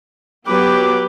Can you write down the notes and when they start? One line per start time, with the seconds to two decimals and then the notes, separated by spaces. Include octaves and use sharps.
0.47 F#3 B3 G4 B4 D6